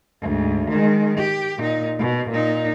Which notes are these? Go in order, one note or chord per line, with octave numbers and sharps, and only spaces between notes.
D2 G#2
D#3 G#3
G4
A#2 D#4
B2
A#2 D#4